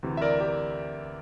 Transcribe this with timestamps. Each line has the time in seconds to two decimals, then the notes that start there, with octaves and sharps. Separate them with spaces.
0.03 D2 C3 E3
0.17 E5
0.21 A#4 D5
0.40 G4 A#4